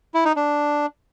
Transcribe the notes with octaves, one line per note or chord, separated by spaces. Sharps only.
E4
D#4
D4